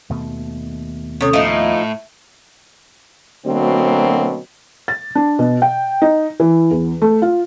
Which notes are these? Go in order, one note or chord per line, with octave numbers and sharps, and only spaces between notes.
D#2 B2 A3
C3 C#4 A4 C#5 D#6
A2 F3 D#4 E5
D2 B2 F#3 A#3 C4
A6
D4
B2
G5
D#4
E3
E2
A3
F4